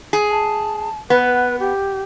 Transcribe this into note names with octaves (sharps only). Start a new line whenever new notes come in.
G#4
A5
B3 B4
G4